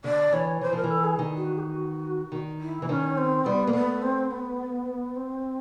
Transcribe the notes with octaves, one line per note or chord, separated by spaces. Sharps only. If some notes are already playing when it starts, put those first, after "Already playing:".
D3 D5
E3 C#5
E3 C5
F3 A#4
E3
A4
G#4
D#3
F#4
G#4
F#4
D#3
E4
E3
D#3 C#4 D4
C4
G3 B3
A#3
A3 B3
C4
B3
C4